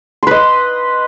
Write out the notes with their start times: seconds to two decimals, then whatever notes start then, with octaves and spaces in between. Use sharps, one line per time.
0.23 C6
0.27 B4
0.31 D#5